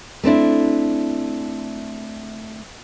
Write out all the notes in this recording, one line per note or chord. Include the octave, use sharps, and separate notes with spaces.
A3 C4 D4 E4